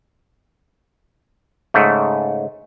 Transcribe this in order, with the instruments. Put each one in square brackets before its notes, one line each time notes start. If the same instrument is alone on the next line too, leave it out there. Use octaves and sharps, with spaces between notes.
[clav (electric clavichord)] G#2 C#3 A3